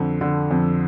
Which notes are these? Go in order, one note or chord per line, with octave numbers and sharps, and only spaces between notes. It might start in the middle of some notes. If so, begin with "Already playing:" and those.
Already playing: F2 D3
D3
F2